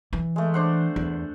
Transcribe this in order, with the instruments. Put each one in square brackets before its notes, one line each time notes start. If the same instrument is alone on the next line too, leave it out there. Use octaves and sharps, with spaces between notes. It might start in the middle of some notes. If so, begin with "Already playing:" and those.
[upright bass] E3
[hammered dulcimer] G#3 A3
D4 C5 F#5
[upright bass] E2